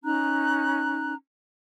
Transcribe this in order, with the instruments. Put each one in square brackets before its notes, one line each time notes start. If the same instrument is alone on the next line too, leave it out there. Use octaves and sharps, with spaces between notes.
[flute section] C#4 D#4 A#5 F#6